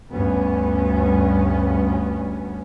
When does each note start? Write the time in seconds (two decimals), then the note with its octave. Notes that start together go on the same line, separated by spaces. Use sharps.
0.11 D2 G2 B3 C#4